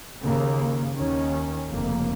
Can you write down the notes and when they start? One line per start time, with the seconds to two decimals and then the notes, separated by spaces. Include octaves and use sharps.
0.24 D#2 C#3 A#3
0.96 D#2 D#3 C#4
1.68 F1 F2 C#3 A#3